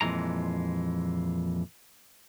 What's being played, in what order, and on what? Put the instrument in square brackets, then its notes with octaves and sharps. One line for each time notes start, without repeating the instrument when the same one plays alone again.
[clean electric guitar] F2 A#2 E3 G#3 A#5